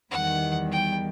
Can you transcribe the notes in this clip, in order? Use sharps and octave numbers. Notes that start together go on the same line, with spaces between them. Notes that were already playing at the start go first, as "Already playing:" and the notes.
E2 D#3 G3 F#5
G5